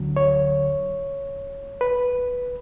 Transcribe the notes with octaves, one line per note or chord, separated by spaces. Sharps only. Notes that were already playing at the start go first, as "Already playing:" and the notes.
Already playing: D2 D3 F#3
C#5
B4